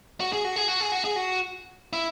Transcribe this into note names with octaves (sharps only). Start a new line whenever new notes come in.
F#4
G#4
F#4
G#4
F#4
G#4
F#4
G#4
F#4
E4